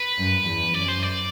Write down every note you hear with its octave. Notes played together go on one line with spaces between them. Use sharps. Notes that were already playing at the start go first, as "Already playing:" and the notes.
Already playing: B4
F#2
E2
F#2 D5
C5
D5